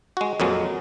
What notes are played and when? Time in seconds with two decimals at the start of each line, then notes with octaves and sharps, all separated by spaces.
0.17 G#3 F#4
0.40 F2 A#2 F#3 G#3